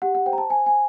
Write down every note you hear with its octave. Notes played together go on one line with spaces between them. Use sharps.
G4 F#5
F#5
C5 G5
A#5
A5
C5 G#5
G#5